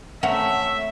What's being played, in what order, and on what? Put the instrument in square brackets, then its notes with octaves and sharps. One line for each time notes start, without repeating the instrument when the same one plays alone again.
[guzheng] A3 C4 C#4 [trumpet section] E5 [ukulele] F#5 A#5